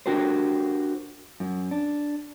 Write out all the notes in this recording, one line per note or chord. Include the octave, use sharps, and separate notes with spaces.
D4 F#4 G4 A#4 C5
F#2
D4